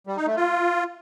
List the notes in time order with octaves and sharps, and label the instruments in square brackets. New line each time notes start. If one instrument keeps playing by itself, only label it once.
[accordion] G3
D#4
A3
F4